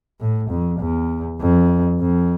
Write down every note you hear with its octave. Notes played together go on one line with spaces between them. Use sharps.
A2
F2
E2
F2
F2